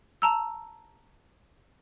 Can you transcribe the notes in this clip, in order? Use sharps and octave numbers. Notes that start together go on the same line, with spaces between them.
A5 A#5 E6